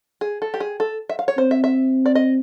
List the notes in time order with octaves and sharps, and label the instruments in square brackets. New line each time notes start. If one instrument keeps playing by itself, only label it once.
[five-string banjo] G#4
A4
G4
G#4
A4
E5
F5
C#5
[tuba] C4 [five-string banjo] C5
[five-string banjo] E5
E5
D5
D#5